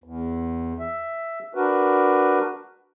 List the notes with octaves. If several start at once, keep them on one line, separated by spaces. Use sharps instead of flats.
E2
E5
D4 F#4 A#4 B4